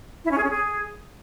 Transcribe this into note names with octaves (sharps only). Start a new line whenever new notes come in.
E4
C#4
G#4
C#4
G#4